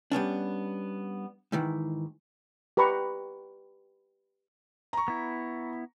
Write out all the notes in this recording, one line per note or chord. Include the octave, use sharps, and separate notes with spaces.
G3 B3 C#4 D4
G#2 D#3 E3
G4 B4 A#5 B5 C#6
A#5 C#6
B3 E4